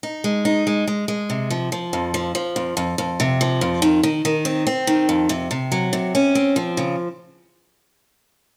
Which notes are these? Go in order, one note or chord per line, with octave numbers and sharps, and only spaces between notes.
D#4
G#3
D#4
G#3
G#3
G#3
C3
F3
F3
F2
F3
F3
F2
F2
F2
C3
F3
F2
D#3
D#3
D#3
C4
C4
D#3
F2
C3
C3
F#3
C3
C#4
C4
F3
C#3